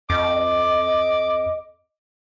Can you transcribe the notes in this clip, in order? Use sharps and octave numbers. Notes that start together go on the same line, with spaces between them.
F2 D#5 D6